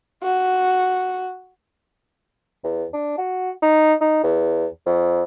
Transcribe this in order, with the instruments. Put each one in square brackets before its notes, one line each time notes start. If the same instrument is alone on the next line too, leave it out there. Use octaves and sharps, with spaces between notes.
[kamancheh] F#4
[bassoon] E2
D4
F#4
D#4
D#4
E2
F2